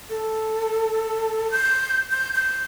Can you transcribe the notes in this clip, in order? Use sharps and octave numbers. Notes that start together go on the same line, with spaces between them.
A4
G6
G6
G6